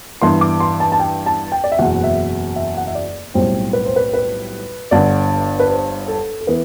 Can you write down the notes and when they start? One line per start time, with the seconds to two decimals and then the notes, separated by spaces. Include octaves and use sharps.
0.22 G2 E3 B3 C6
0.41 D6
0.60 C6
0.80 A5
0.92 A5
0.99 G5
1.26 A5
1.52 G5
1.64 D5
1.72 E5
1.78 F#1 E2 B2 F#3 F#5
2.04 E5
2.56 E5
2.77 F#5
2.87 E5
2.95 D5
3.34 B1 A2 G3 C4 C5
3.73 B4
3.85 C5
3.96 B4
4.14 B4
4.91 G1 G2 D3 D5
5.60 B4
5.70 C5
6.08 A4
6.41 A4
6.47 E3 B3 B4